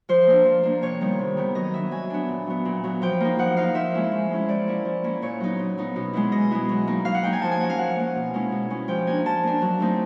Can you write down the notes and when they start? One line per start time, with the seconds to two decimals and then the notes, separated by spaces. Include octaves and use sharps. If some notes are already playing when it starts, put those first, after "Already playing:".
0.09 F3 C5
0.27 A#3 D4
0.45 F3
0.63 A#3 D4
0.82 C3 C#5
1.01 D#3 G3 B3
1.19 C3
1.37 D#3 G3 B3
1.55 F#3 D#5
1.74 B3 D4 E5
1.91 F#3 G#5
2.10 B3 D4
2.28 A#2
2.47 F#3 B3
2.65 A#2
2.84 F#3 B3
3.02 F3 G5
3.20 A#3 D#4
3.38 F3 F#5
3.57 A#3 D#4 F5
3.75 F3 E5
3.94 G#3 C#4 E4
4.11 F3
4.30 G#3 C#4 E4
4.49 F3 D5
4.67 A#3 C#4 E4
4.85 F3
5.04 A#3 C#4 E4
5.22 A#2 C#5
5.40 F#3 B3 D#4
5.59 A#2
5.77 F#3 B3 D#4
5.96 B2
6.13 G#3 B3 E4
6.32 B2 D#5
6.51 G#3 B3 E4
6.69 F#3
6.87 A#3 D#4
7.05 F#3 F5
7.14 F#5
7.23 A#3 D#4 G5
7.33 G#5
7.42 F3 A5
7.51 G#5
7.60 A#3 C#4 F#5
7.70 F5
7.78 F3 F#5
7.96 A#3 C#4
8.15 B2
8.34 G#3 C#4 E4
8.52 B2
8.70 G#3 C#4 E4
8.88 F3 G5
9.07 A#3 D4 G#5
9.25 F3 A5
9.43 A#3 D4
9.61 F#3
9.80 A3 C4 D#4